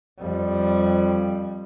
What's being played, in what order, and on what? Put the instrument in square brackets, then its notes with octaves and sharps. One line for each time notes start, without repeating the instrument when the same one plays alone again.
[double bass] F2 G3